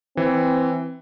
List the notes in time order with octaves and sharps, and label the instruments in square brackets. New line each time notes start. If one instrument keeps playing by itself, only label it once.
[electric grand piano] E3 [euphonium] C4